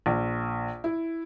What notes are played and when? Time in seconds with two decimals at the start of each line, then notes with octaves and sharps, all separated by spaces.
0.06 A#1
0.84 E4